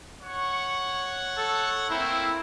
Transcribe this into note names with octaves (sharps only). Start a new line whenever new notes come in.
C#5 F#5 C#6
A4
A3 A#3 C4 E4